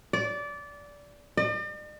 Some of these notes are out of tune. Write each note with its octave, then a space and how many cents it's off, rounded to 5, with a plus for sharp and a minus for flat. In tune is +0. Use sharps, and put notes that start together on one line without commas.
D5 -20
D5 +45